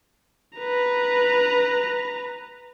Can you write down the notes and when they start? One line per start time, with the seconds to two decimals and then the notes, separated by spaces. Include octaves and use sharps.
0.59 B4 A#5